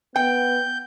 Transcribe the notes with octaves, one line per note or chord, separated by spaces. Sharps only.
B3 G5 G6